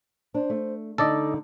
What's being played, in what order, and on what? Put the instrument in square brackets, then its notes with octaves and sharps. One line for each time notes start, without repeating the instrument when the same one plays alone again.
[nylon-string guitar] D4 [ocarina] C5
[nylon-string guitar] A3
[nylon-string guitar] D3 [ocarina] D#4 [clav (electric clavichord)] A4 D5 D#5